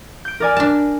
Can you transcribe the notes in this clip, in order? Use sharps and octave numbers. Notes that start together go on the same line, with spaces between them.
G6 D7
A#4 D5 G#5
D4 A5